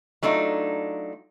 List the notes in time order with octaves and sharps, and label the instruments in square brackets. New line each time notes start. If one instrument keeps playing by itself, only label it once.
[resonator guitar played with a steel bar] F#3 A3 D4 D#4 F4